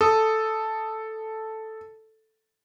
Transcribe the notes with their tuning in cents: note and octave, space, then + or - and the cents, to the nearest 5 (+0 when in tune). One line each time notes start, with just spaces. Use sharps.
A4 +0 D#6 +0